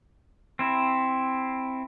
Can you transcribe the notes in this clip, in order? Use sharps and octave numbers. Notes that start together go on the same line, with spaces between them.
C4 E4